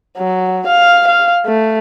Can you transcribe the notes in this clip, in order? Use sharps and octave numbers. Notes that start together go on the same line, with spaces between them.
F#3
F5
F5
A3